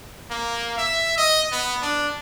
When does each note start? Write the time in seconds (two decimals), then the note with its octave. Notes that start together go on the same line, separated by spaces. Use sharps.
0.31 A#3
0.77 E5
1.17 D#5
1.52 B3
1.82 D4